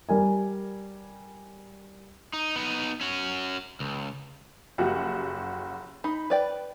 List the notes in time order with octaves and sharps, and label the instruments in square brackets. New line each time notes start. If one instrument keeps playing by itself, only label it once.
[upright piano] G3 A#4 G#5
[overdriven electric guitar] D#4
B3 D#4
C#4 F#4
C#2
[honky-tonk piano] F#1 F#4 G4 [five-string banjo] F3
[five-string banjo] D#4 [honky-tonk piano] B5
[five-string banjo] B4 D5 G5